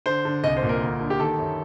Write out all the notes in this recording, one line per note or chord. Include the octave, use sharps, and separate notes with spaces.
D3 C5
D3
C2 D#5
C5
A#2
A#4
D2
D3
G4
D#3 A4
F#2